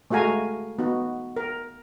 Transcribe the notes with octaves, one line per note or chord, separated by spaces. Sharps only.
G#3 A3 F#4 F5 G#5 A#5
B3 D#4 F#4
A#4